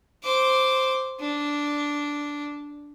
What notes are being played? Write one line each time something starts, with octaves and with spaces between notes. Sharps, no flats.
C5 D6
D4